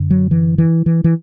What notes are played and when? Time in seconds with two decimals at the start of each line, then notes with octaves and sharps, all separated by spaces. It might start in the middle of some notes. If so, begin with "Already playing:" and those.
Already playing: F#2 D3
0.10 F#3
0.31 E3
0.58 E3
0.86 E3
1.04 E3